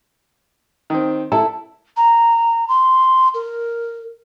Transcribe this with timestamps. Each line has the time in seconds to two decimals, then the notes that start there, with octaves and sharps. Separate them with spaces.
0.90 D#3 C4
1.32 E4 A4 A5
1.97 A#5
2.68 C6
3.34 A#4